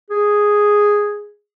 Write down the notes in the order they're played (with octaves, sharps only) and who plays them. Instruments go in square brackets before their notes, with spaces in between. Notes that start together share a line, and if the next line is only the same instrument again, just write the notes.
[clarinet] G#4